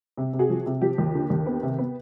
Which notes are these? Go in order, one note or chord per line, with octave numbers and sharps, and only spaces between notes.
C3
C3
F#4 G#4
F3
C3
F3 G4
D#2
D3
D#2
B3
C3
B3